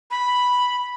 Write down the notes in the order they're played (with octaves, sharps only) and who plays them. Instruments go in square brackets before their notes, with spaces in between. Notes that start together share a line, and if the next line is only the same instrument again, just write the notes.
[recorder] B5